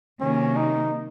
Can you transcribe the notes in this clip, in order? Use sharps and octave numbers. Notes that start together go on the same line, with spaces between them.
C3 D#3 F#3 A#3 C#4
D#4